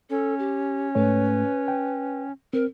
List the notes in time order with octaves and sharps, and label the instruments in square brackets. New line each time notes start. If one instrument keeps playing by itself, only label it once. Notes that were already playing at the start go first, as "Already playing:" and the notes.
[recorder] C#4 [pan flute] A4
[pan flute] G4
[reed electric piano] G#2 A3 C#5 [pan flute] B4
[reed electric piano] G5
[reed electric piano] C4 [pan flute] A#4